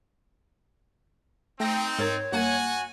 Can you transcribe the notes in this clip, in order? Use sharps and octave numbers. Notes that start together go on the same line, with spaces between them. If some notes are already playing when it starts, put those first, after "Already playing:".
A3 C4 D#4 G5 A#6
G#2 A#4 C#5 A6
G2 A#3 F#4 F#5 G#5